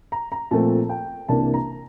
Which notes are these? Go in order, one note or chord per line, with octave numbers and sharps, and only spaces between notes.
A#5
A#5
A#2 F3 A3 C4 A5
G5
C2 C3 E3 A#3 D4 A5
A#5